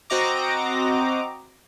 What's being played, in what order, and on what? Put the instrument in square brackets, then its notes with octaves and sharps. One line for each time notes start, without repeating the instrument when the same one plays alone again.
[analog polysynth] C4 F#4 D#5 A#5 D6